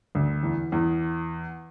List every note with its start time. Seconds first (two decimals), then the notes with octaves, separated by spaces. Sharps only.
0.15 D2
0.43 E2
0.72 E2